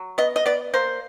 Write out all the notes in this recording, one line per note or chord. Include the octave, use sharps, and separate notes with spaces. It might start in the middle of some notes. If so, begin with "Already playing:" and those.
Already playing: F#3
B3 D#5
D#5
B3 D5
A#3 C5